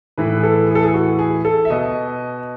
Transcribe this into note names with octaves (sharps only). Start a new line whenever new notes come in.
A2 E3 B4
G#4
A4
G#4
A4
G#4
F#4
G#4
A4
E5
B2 D#5